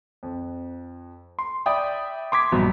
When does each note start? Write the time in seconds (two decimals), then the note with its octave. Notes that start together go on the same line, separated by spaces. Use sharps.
0.23 F2
1.39 C6
1.66 D5 E5 G5 B5 D#6
2.32 C6 D6 G#6 B6
2.52 A#1 G2 B2 F#3